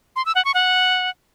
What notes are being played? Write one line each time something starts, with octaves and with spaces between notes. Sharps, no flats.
C6
E6
F#5
C#6
F#5